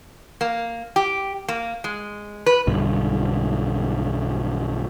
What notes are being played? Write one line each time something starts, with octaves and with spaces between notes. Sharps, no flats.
A#3
G4
A#3
G#3
B4
B1 G2 D3